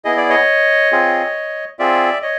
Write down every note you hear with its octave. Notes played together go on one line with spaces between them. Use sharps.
B3 E4 G#4 D#5
D5
C#5 D#5
C4 F4 G#4
C4 F4 G#4 D5 E5
C#5 D#5